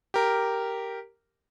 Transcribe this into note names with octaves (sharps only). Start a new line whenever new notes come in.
G4 A#4